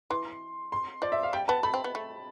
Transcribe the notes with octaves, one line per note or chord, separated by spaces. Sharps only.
E3 C6
C6
F3 D5
E5
F5
G3 G5
B3 A5
A3 B5
C4
B3
A3